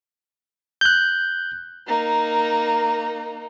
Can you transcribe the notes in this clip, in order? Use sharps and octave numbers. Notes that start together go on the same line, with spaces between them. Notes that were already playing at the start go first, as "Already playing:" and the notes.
F#6 G6
A#3 D#4